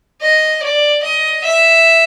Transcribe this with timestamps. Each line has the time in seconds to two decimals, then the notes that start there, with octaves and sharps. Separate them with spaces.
0.22 D#5
0.63 D5
1.03 D#5
1.44 E5